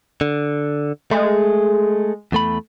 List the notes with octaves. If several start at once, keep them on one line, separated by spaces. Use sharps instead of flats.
D3
G#3 A3
E2 A3 B5